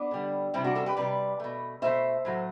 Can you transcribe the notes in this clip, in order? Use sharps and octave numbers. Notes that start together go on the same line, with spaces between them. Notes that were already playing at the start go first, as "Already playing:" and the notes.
Already playing: B3 D4
D3 G3
C3 G3 C4 E4
D4 F#4
F#4 A4
G4 B4
C3 G3 B4 D5
B2 A3
B2 A3 C5 E5
A2 F#3 A3